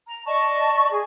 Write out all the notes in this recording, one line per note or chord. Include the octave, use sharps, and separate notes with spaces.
A#5
D5 D#5 A5 C#6
G#4